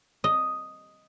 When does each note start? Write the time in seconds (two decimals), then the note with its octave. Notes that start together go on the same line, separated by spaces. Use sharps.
0.24 D#5